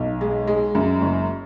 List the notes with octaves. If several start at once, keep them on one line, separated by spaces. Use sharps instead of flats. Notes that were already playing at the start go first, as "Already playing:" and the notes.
Already playing: B1
G#3
G#3
F#2
F#1